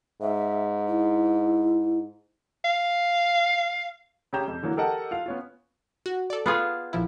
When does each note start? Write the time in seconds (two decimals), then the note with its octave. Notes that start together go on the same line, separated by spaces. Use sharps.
0.21 G#2 E5
0.88 E4
2.65 F5
4.33 C#3 C#4 G4 A#5 G6 E7
4.48 F2
4.63 D3 E3 F#3 A#3
4.77 G4 A4 A#4 D#5 F#5 A5
5.11 F4 F5
5.26 B3 C#4 F4
6.06 F#4
6.30 A4 D5
6.46 B3 F4 G#4
6.93 A#1 F3 E4